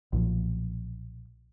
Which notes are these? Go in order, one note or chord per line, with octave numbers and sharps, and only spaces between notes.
B1 A#2 F3